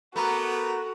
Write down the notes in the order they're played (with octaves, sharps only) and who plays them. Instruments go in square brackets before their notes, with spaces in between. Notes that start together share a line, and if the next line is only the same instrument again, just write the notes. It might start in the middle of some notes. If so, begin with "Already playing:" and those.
[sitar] A3 [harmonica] B3 A#4 [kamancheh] F#4 [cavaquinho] B4 A#5 D6